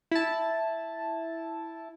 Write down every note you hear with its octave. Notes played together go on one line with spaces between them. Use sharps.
E4 A5